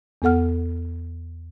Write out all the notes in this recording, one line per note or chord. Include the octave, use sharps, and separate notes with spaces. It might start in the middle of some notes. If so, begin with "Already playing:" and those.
E2 B3 A4 F#5 F6